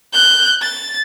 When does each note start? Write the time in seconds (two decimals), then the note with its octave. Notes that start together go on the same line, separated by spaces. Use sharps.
0.13 F#6 G6
0.61 A6